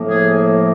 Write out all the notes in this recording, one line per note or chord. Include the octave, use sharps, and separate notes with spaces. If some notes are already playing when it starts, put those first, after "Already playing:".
Already playing: A2 F3 A#3
G#4